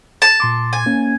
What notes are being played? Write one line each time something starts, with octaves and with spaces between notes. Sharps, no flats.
A5
A#2 C6 D6
G#5
A#3 C#4